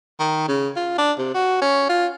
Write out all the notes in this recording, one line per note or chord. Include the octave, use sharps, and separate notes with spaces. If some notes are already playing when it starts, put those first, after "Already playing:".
D#3
C#3
F4
D4
C3
F#4
C#4
F4